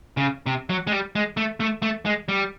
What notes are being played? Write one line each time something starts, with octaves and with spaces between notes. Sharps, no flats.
C#3
C3
F#3
G#3
G3
G#3
A3
A3
A3
G#3
G3